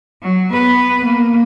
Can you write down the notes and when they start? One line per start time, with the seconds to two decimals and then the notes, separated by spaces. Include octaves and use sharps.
0.23 F#3
0.51 B3 B4
1.05 A#3